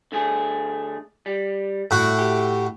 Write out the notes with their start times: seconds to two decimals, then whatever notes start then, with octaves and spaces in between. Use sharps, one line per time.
0.12 D3 A3 G#4
1.26 G3
1.91 C2 A2 F#4
2.19 G4